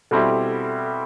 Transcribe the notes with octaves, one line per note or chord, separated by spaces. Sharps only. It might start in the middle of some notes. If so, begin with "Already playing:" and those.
B2 G3 C4 E4 G4 A4